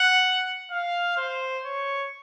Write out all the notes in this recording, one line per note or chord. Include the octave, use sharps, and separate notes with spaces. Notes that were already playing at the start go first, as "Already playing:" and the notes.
Already playing: F#5
F5
C5
C#5